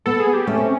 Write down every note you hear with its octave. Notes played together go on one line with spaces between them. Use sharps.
B3 A4
G#4
G4
A3 C#4
C4